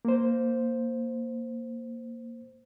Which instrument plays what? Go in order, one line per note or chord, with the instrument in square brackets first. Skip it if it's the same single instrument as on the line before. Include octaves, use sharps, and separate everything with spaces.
[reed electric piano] A#3 C5